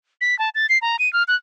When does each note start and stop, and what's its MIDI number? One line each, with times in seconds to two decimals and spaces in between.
0.21 0.37 95
0.39 0.49 81
0.55 0.66 93
0.69 0.78 96
0.82 0.97 82
0.99 1.11 99
1.13 1.23 89
1.28 1.36 90